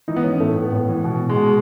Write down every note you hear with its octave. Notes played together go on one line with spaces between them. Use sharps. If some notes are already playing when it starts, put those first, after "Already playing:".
E3 D#4
B3
E3 C#4
A2 A3
A2 B3
A2
E3
B2
B2
G#3
B2